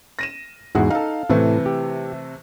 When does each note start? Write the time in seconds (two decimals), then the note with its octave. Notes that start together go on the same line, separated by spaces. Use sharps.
0.19 A#6 D#7 E7
0.75 E2 G#2 E4 F#4 G#4
0.90 D#4 A4 F5
1.29 A2 C3 E3 A3
1.66 G4